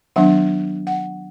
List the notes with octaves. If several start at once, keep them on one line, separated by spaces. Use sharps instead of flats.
D#3 F#3 B3 D4 F#5
F#5